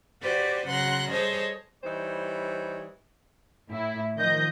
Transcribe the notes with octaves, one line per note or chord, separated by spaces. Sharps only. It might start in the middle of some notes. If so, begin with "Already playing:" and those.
F#4 G4 B4 C5 D5
C#3 F#3 F#5 C6 F#6 A#6
G3 G#4 A4 C5 C#5 D#5
E3 G3 D#4 C5 C#5
A2 E4
D#3 F3 D#5 G6 A#6